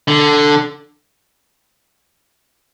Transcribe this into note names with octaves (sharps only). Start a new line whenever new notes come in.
D3